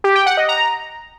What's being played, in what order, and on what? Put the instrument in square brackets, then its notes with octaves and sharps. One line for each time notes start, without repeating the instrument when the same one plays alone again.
[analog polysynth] G4
G5
F#5
D#5
A#5